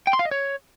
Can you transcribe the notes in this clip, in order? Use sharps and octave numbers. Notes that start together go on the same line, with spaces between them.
G5
C6
F5
D#5
C#5